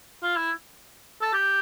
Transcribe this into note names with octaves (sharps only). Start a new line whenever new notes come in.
F4
E4
A4
G4